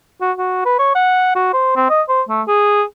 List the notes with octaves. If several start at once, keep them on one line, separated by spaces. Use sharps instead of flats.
F#4
F#4
B4
C#5
F#5
F#4
C5
C4
D#5
C5
A3
G#4